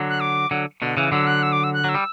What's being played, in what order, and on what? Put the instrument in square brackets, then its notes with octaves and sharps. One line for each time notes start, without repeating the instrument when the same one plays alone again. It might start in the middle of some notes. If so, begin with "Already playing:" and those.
Already playing: [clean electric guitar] D3 F#3
[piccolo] F#6
D6
[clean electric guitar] D3 F#3
B2 D3
C#3 E3
[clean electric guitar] D3 F#3 [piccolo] E6
[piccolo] F#6
E6
D6
E6
F#6
[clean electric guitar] F#3 [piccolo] E6
[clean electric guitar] G3